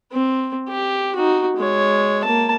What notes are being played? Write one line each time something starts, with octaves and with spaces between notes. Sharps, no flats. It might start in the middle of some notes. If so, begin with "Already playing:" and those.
C4
G4
D#4 F#4
G#3 C#5
A#3 A5